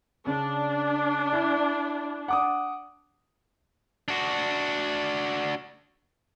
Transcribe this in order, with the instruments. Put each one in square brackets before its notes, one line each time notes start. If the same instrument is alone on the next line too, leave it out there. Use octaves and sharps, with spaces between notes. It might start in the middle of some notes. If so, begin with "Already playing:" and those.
[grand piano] C#3 [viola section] D4
[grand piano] E4
F#5 D6 D#6
[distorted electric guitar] D4 F#4